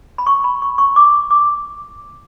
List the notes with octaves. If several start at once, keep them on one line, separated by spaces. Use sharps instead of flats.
B5
C#6
B5
C#6
C#6
D6
D6